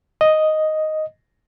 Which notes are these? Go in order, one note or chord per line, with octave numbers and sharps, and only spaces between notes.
D#5